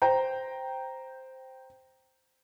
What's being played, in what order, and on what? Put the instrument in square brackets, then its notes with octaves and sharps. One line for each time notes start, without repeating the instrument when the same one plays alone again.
[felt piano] C5 G5 A#5